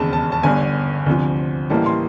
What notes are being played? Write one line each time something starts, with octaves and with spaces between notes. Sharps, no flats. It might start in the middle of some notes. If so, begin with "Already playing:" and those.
Already playing: E1 D#2 C#3 A5
A5
A5
G1 G2 D3 G#5
D2 C3 F3
A1 A2 E3 G3 A#3 A5
C6